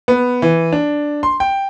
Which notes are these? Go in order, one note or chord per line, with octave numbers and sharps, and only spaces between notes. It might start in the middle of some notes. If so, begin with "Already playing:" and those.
B3
E3
D4
C6
G5